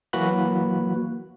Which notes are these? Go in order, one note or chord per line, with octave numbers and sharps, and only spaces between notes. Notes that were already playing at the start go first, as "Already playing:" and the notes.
E3 F#3 A#3 F#4 B5 F#6